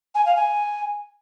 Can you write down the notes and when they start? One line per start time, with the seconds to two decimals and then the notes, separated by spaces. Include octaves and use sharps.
0.15 G#5
0.26 F5
0.36 G#5